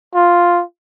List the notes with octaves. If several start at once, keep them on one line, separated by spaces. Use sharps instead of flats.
F4